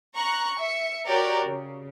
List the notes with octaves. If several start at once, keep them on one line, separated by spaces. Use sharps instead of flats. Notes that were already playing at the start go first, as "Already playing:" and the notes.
A#5 C#6 F#6
E5 C#7
F#4 G4 A#4 C#5 D5 G5
C#3